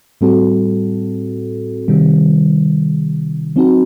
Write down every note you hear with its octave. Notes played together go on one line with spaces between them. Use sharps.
A2 G3 C4 F#4 A4
C3 D#3 G3
F#3 C4 D#4 F#4